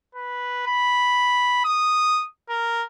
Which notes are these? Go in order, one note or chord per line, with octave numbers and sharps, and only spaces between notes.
B4
B5
D#6
A#4